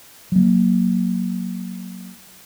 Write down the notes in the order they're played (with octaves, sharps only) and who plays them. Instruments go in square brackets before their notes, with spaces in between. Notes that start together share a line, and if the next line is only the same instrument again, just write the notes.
[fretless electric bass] F#3 A#3